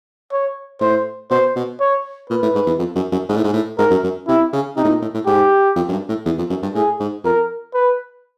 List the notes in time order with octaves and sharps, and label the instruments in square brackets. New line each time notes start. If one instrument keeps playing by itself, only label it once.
[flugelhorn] C#5
[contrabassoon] A2 [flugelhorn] C5
[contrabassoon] B2 [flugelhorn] C5
[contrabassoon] B2
[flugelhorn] C#5
[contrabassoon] A#2 [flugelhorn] B4
[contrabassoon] A2
G#2
E2
F2
F#2
F#2
G#2
A2
G#2
A2
[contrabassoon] G#2 [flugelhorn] A#4
[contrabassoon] F#2
F#2
[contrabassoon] C3 [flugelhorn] E4
[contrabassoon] C#3
[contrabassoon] C3 [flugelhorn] D#4
[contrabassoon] A2
A#2
A2
A2
[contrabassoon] G#2 [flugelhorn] G4
[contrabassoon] F2
F#2
G2
A2
E2
F2
F#2
G2
[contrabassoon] A2 [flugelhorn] G#4
[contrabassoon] G#2
[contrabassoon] F2 [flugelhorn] A#4
[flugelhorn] B4